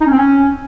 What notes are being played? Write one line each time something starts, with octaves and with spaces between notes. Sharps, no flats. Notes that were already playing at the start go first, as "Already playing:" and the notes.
D#4
C#4
C4
C#4